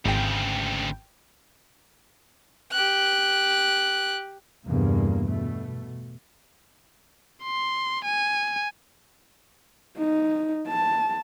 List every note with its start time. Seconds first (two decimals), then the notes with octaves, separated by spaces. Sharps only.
0.06 G#1 D2 C#3 G5
2.72 G4 F#6
4.67 G1 E2 G2 C3 A#3
5.28 B2 A3
7.43 C6
8.05 G#5
9.98 D#4
10.68 A5